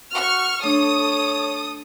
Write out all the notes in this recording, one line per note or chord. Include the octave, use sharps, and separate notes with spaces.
F#4 C#6 F6
A3 D4 A4 C#5 D#6